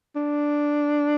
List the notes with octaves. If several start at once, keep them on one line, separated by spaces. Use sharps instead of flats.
D4